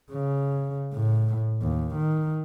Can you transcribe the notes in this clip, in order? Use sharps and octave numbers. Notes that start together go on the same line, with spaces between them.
C#3
A2
D#2
D#3